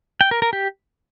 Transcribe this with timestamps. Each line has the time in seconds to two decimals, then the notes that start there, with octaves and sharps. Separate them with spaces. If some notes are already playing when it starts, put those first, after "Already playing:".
0.21 G5
0.31 A#4
0.42 A#4
0.53 G4